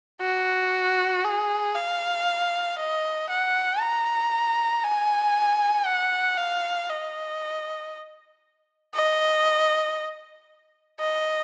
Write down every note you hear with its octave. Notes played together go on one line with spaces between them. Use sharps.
F#4
G#4
F5
D#5
F#5
A#5
G#5
F#5
F5
D#5
D#5
D#5